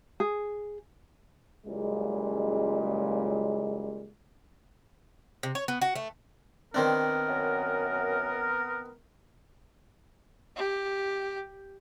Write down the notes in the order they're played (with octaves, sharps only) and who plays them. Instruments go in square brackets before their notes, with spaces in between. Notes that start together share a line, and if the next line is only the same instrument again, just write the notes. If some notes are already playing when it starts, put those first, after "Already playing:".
[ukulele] G#4
[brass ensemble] F#1 C#2 A#2 C#3 G3 G#3
[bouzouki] C3
C#5
B3
F#4
A3
[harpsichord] D#3 C4 D4 [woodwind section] B3 A#4
[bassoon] F#2
[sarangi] G4